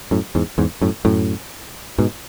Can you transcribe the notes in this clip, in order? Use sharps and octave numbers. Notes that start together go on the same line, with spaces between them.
F#2 A2
E2 G#2
E2 G#2
F#2 A2
F#2 A2
G#2 B2